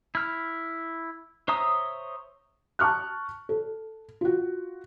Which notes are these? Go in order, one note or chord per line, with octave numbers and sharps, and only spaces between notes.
E4 F6
C5 C#5 E5 A#5 D#6
A5 C#6 F6 F#6
A4
F4 F#4